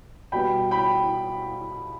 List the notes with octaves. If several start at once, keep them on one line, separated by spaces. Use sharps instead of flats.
B2 G3 B3 G5 B5
G5 B5